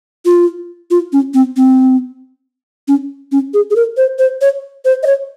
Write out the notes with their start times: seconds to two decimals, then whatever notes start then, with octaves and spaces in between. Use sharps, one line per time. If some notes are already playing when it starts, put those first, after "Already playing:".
0.25 F4
0.91 F4
1.13 C#4
1.34 C4
1.57 C4
2.88 C#4
3.32 C#4
3.54 G#4
3.70 G#4
3.76 A#4
3.97 C5
4.19 C5
4.41 C#5
4.85 C5
5.03 D#5
5.06 C#5